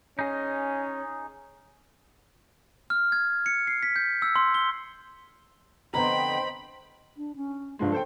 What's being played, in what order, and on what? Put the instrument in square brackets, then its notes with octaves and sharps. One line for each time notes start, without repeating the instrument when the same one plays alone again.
[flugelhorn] C#4 [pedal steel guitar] D#4 G#4 D#5
[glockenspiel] F6
G#6
C#7
C7
B6
G6
E6
C6
G7
[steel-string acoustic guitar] F2 D3 B3 [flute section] C5 D#5 G5 [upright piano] A#5 [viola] B5
[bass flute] D4
C#4
[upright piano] G2 F3 G#3 [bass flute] D4
[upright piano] A4 C5 G5